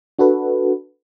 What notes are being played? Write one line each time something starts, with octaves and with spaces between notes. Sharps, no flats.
D4 F#4 A4 B4